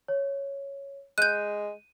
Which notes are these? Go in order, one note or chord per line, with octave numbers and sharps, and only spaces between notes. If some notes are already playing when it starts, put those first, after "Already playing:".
C#5
G#3 F#6 G6 D#7